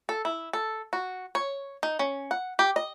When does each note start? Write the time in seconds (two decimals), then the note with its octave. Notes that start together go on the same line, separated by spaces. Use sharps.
0.09 A4
0.25 E4
0.53 A4
0.93 F#4
1.35 C#5
1.83 D#4
1.99 C#4
2.31 F#5
2.59 G4
2.76 D#5